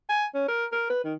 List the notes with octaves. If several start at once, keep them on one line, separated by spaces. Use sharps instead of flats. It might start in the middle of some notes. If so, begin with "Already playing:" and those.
G#5
C#4
A#4
A#4
B4
D#3